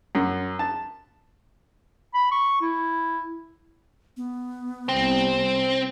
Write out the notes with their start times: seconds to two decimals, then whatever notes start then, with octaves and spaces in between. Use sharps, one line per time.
0.15 F#2
0.59 A5
2.14 B5
2.31 C#6
2.61 E4
4.17 B3
4.89 C2 C4